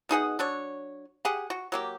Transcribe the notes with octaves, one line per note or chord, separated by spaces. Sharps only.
B2 D#4 G#4 F#5
F#3 D4 C#5
G4 G#4 F#5
F#4
F#3 A#3 G4